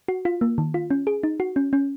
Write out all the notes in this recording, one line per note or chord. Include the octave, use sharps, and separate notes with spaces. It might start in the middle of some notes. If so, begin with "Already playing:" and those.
F#4
F4
A#3
D#3
F4
C#4
G#4
D#4
F#4
C#4
C#4